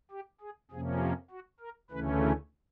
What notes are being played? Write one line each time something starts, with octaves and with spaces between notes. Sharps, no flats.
G4
G#4
F2 C3 F3 A#3 C#4 G#4
G4
F#4
A#4
D2 C#3 E3 A3 C#4 B4
A#4